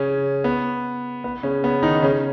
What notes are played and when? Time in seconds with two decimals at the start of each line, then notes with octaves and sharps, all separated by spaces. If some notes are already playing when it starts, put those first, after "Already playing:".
Already playing: C#3 C#4
0.44 B3
1.24 B3
1.43 C#3 C#4
1.64 B3
1.82 D#3 D#4
2.03 C#3 C#4